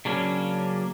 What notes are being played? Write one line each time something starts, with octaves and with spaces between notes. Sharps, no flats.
C#3 F#3 A#3 C#4 D4